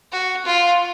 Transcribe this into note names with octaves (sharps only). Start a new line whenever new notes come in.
F#4
F4